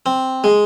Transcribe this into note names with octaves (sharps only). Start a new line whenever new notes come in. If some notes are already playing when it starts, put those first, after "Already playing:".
C4
G#3